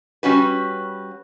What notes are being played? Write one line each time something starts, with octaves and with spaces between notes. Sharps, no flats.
G3 C#4 F#4 B4